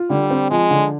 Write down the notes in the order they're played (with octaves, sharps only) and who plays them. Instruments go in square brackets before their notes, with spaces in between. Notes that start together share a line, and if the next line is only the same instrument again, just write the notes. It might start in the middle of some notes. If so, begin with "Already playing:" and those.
Already playing: [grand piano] F4
[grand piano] D3 [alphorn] G3
[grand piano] C4
[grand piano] F3 [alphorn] G#3
[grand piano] D3